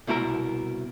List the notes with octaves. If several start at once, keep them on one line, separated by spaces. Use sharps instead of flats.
C2 B2 E4 F4 A#4